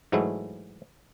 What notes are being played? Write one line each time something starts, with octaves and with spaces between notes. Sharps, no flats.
G#2 E3 F#3 G#3 A3 E4